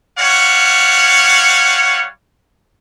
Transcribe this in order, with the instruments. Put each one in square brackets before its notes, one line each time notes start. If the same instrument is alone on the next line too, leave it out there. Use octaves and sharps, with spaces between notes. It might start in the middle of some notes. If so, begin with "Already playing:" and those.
[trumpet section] G3 C#5 F5 F#5